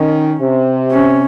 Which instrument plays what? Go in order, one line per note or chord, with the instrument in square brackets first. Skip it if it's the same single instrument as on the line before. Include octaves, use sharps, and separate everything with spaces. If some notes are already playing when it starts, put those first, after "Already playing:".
Already playing: [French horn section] D#3 [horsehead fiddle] C#4
[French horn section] C3
[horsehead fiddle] C#4